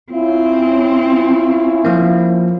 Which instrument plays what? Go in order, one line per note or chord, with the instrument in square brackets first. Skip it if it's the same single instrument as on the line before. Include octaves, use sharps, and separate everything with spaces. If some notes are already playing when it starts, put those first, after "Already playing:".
[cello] C4 [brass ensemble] C#4 E4 F4
[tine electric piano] F3 A#3